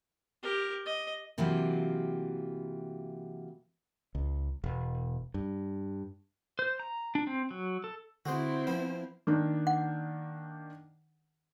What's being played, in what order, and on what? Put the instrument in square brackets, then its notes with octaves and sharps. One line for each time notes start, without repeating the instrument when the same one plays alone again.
[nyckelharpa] G4 A#4
D#5
[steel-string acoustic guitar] C3 E3 F#3 A#3 F4 G4
[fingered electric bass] C#2
E1
G2
[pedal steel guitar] C5
A#5
D4
C4
F#3
A4
[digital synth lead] D3 [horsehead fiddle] C4 E4 [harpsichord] F#4 G#4 C5
[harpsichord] F3 B3 [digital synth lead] C5
[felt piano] D#3 A#3 D4
[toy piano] F#5